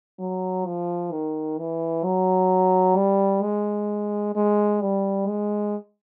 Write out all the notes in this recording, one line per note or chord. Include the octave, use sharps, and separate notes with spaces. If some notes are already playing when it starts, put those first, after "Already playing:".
F#3
F3
D#3
E3
F#3
G3
G#3
G#3
G3
G#3